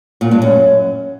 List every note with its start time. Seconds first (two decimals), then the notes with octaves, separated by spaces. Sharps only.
0.21 A#2
0.31 G2
0.42 F#2